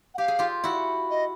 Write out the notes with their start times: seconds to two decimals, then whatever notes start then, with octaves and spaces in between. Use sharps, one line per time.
0.14 F#5
0.18 G4 F5
0.28 G#4
0.39 F4 G4
0.64 E4 F#4
1.10 D#5